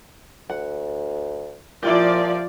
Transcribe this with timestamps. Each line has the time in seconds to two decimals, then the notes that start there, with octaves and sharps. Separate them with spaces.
0.50 D2 F#5
1.83 A#2 F3 E4 F4 G4 D5